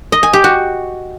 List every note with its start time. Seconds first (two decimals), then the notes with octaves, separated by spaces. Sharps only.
0.12 D#5
0.23 G#5
0.33 G4
0.44 F#4